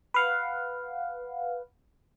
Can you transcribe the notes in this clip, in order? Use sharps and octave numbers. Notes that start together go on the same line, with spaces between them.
B4 F5 F#5